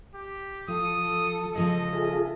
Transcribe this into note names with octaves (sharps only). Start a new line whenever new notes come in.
G4
F3 F4 A4 D#6
C#3 F3 G#3 D#5
F4 G#4 A4 E5